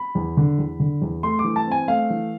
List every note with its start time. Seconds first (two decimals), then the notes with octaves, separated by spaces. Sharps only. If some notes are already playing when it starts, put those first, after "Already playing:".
Already playing: B5
0.15 E2
0.37 D3
0.58 E2
0.80 D3
1.02 E2
1.23 A3 C6
1.39 D6
1.44 E3
1.56 A5
1.67 C4 G#5
1.88 A3 F5
2.10 E3